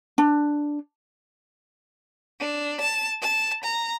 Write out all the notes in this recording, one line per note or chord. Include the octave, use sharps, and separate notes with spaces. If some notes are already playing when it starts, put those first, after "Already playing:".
D4
D4
A5
A5
A#5